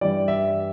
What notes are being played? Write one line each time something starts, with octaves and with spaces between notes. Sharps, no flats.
G2 E3 G3 D5
E5